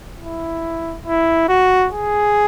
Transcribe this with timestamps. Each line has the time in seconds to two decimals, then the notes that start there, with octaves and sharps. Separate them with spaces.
0.20 E4
1.06 E4
1.49 F#4
1.92 G#4